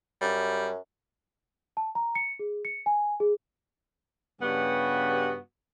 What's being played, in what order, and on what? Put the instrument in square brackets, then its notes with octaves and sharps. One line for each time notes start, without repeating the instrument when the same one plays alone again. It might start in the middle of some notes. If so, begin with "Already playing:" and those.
[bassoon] F#2 [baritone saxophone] G3
[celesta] A5
A#5
C#7
G#4
C#7
G#5
G#4
[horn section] G2 C#3 G3 B3 F#4 G4